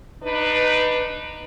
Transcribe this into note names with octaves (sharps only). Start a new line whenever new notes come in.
D4 D#4 B4